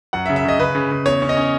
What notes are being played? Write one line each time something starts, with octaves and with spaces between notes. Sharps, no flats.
F#2 F#5
E5
C#3
E5
C#3 D#5
C#3 B4
C#3
C#3
E2 C#5
C#4
D#5
C#4